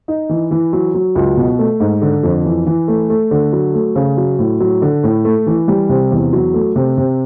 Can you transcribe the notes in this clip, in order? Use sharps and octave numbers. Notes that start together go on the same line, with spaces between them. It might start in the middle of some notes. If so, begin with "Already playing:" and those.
D#4
E3
E3
F#3
F#3
C#2
B2
A3
G#2
D3
F2
E3
E3
A3
A3
D3
F#3
A3
C#3
F#3
A2
F#3
D3
A2
A3
E3
G3
C3
E2
F#3
A3
C3
C3